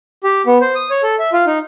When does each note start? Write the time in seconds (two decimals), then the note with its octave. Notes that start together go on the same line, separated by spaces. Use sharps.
0.24 G4
0.47 B3
0.61 C5
0.75 D#6
0.90 C#5
1.03 A4
1.19 E5
1.33 F4
1.47 D#4